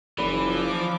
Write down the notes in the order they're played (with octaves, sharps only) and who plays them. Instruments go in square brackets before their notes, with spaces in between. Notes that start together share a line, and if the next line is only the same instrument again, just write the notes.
[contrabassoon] F#1 [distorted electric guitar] E3 [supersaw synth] F3 D6 [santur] D5 B5